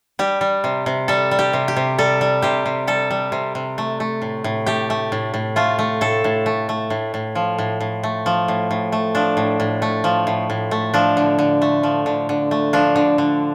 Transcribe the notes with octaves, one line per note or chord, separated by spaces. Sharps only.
G3 G4
G3
C3
C3
G3 A4
G3
G4
C3
G4
C3
G3 A4
G3
C3 G4
C3
G3 A4
G3
C3
C3
A3
A3
A2
A2
A3 G4
A3
A2
A2
A3 F4
A3
A2 A4
A2
A3
A3
A2
A2
F3
A2
A2
A3
F3
A2
A2
A3
F3 D4
A2
A2
A3
F3
A2
A2
A3
F3 D4
D3
D3
A3
F3
D3
D3
A3
F3 D4
D3
D3